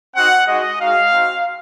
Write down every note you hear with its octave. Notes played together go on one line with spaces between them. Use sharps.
C4 D#4 F#4 F#5
G#3 D#4 F#4 D#5
G#3 D#4 F#4 F5
C4 D#4 F#4